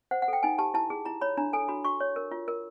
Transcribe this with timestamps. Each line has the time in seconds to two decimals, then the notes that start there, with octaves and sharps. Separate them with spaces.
0.11 C5 F#5
0.22 F#5
0.28 A4 G5
0.43 D#4 G#5
0.59 G4 A5
0.74 E4 A5
0.90 G#4
1.05 E4 A#5
1.21 C#5 B5
1.37 D4 A#5
1.53 A4 G#5
1.68 F#4 B5
1.85 F#4 C#6
2.00 C#5
2.16 A#4
2.31 F4
2.48 A#4